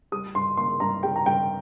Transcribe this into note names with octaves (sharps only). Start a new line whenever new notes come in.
G3 D#6
G2 C6
A#3 C6
G2 A#5
G3 G5
A#5
G2 G5